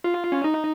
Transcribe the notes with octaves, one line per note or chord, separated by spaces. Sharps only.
F4
C#4
D#4